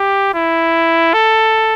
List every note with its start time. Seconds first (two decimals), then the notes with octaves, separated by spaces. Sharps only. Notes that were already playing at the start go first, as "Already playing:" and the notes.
Already playing: G4
0.34 E4
1.14 A4